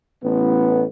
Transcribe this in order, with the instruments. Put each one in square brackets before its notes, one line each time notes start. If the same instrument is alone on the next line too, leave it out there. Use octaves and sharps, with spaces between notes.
[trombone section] A1 B3